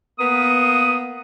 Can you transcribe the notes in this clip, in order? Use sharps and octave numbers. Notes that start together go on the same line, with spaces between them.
A#3 B3 D#6